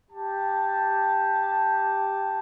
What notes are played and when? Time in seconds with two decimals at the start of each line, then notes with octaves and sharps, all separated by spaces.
0.10 G4 A5